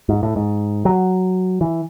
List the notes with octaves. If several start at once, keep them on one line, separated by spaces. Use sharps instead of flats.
G#2
A2
G#2
F#3
E3